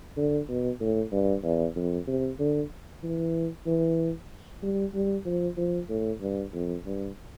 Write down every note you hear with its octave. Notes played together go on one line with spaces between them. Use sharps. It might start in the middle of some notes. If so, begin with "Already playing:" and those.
D3
B2
A2
G2
E2
F2
C3
D3
E3
E3
G3
G3
F3
F3
A2
G2
F2
G2